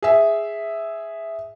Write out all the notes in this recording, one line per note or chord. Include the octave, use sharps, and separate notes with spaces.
G#4 E5